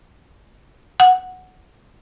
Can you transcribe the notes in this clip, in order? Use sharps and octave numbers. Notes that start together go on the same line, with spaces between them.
F#5